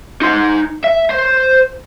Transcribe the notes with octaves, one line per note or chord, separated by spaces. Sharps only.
D#4 C6
E5
C5